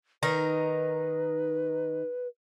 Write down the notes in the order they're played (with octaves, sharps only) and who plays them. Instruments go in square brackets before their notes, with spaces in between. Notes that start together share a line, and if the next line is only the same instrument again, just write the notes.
[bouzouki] D#3 D#4 A#4 [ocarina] B4